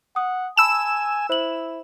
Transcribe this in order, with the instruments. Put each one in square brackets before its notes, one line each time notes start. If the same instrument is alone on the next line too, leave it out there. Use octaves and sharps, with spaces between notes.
[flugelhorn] F#5 [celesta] D#6
[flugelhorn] G#5 [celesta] A5 B5 [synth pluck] E6 E7
[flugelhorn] E4 [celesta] C5 F#7